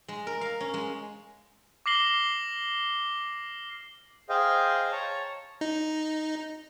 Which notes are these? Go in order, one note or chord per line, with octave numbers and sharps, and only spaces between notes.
G#3
A#4
F5
C#4
G#3
D6 F6 A#6 C7 F#7 G7
G#4 C5 D#5 F5 G5
C#5 A5 A#5
D#4